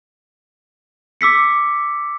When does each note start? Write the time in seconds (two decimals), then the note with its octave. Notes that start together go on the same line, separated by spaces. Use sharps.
1.21 D6 E6 B6 C#7